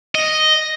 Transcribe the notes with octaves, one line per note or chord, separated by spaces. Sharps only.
D#5